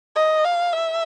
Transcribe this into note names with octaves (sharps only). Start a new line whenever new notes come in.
D#5
F5
E5